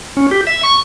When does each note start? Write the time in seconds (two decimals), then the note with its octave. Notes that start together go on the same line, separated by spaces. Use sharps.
0.17 C#4
0.31 G4
0.47 E5
0.63 C#6